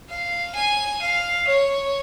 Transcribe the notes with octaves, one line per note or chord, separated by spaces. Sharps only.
F5
G#5
F5
C#5